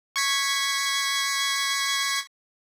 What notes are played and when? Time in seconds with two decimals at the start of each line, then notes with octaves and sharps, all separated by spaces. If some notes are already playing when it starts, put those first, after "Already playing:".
0.16 C#6 G#6 B6